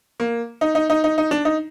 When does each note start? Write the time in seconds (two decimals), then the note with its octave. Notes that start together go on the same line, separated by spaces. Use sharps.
0.20 A#3
0.61 D#4
0.75 D#4
0.90 D#4
1.04 D#4
1.18 D#4
1.31 D4
1.45 D#4